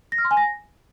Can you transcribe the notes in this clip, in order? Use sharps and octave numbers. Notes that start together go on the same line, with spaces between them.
A#6
F6
C6
G#5
A#6